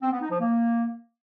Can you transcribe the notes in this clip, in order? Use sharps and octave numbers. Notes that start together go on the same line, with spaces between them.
C4
B3
D#4
F3
A#3